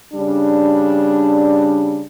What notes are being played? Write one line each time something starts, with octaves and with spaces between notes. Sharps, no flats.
C#3 G3 D4